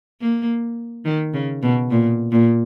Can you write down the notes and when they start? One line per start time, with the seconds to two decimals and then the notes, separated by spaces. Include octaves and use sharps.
0.21 A#3
1.05 D#3
1.34 C#3
1.63 B2
1.91 A#2
2.32 A#2